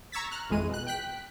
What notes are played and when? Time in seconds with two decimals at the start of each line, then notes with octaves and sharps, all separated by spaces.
0.12 A#5 C#6 E6 G#6 A6 B6
0.31 A#5 F6 F#6
0.49 G#1 F2 E3 G#3 D#7
0.69 B2 F#6
0.87 G5 F#6 B6